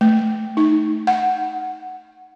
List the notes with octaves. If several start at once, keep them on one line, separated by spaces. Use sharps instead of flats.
A3
D#4
F#5